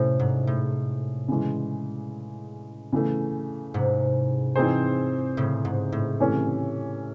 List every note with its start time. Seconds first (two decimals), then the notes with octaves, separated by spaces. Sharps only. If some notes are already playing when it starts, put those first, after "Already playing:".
Already playing: A2 C3 A3 C#4 E4 A4
0.19 G#2
0.47 A2
1.28 C#3 E3 G#3
2.93 C#3 E3 A3
3.74 G#2 C3
4.56 E3 C4 D#4 G#4 C5
5.37 A2 C#3
5.65 G#2
5.92 A2
6.20 C3 E3 A3 C#4